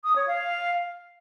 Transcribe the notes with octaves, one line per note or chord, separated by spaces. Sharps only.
D#6
C#5
F5